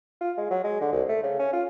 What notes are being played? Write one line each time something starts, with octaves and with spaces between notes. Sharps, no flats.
F4
G#3
F#3
G#3
D3
C2
A3
C#3
C#4
F4